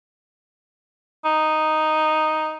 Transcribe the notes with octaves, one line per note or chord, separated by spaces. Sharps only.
D#4